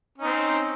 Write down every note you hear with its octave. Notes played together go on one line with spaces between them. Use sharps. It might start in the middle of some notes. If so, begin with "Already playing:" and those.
C4 C#4 D#4